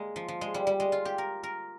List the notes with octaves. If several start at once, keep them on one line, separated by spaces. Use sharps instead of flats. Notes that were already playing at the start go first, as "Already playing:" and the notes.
Already playing: G#3 A#3
F3
F3
G#3
G3
G3
G#3
F4
G4
A#4
A#4